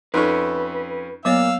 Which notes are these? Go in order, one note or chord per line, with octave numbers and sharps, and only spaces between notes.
F2 C#4 D#4 A4 B4 C#6
A#2 F#3 B3 C#5 F5 E6